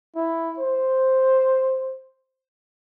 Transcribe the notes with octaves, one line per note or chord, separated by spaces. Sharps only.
E4
C5